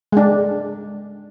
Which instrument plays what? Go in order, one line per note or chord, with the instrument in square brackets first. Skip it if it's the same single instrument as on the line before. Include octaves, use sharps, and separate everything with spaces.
[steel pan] G#3 D4